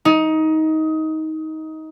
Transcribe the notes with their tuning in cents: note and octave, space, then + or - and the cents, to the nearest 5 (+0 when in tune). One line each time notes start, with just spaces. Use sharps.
D#4 +20